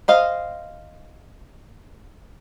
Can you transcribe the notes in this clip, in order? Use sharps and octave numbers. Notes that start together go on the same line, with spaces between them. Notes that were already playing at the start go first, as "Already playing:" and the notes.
C5 D#5 F5